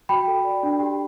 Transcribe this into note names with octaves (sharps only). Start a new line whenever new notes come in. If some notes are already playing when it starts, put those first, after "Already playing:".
F#4 G5 B5
A4
D5
D4
G4